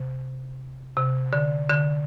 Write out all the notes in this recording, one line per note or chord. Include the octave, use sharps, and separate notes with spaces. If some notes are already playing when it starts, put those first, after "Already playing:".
Already playing: C3
C3
D3
D3